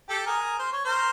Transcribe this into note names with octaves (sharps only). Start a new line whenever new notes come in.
G4 A4
G#4 A#4
C5
C#5
A#4 C5